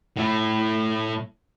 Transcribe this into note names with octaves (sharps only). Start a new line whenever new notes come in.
A2 A3